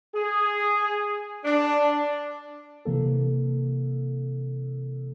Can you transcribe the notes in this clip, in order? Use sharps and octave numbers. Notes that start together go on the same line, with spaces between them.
G#4
D4
C3 E3 A#3 A4